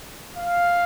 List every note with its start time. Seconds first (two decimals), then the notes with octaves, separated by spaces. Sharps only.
0.37 F5